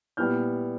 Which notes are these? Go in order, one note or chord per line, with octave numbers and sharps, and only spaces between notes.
A#2 G3 B3 E4 F6 G6